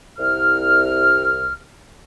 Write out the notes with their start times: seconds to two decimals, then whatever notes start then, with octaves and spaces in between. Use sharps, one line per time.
0.18 C2 F6